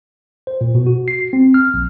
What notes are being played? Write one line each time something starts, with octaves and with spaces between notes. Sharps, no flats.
C5
A#2
B2
F#4
C7
C4
F6
A#1